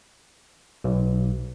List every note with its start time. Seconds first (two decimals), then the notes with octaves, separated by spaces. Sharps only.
0.84 B1